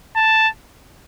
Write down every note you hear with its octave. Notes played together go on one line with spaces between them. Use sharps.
A5